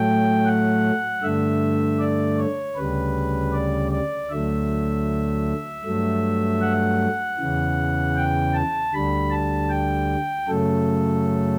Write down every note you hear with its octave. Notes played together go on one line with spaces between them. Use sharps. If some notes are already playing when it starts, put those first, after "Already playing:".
Already playing: A2 F#3 A3 G5
F#5
G2 D3 A3 E5
D5
C#5
D2 C#3 G3 B4
D5
D5
D2 D3 F#3 A3 E5
G2 F#3 A3
F#5
E2 C#3 E3
G5
A5
D2 D3 G3 B5
A5
G5
F#2 C#3 F#3 A3 A4